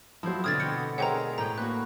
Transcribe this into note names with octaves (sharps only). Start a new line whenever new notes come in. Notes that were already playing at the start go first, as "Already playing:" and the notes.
F3 F#3 E4 C5
B2 D3 C4 D#6 F6 G#6 A6
B2 F#5 G5 C#7
G#3 A#4 C5 C#5 E5 F#5 G5 A#5
A2 G5 A#5
A#3 F#4 B4 F#6